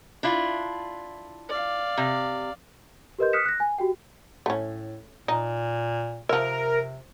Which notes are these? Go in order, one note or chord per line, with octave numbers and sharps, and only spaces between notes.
D4 E4 F4
D5 F5
C3
G4 A#4 B4 D#5 C6 G6
D#6 F6 F#6 B6 C#7 E7
F#6 A#6
G#5
F#4 G4 G5
A2 A3 C#4
A#2 D#4
C3 F3 A#4 E5